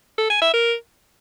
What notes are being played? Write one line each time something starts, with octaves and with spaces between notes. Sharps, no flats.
A4
G#5
E5
A#4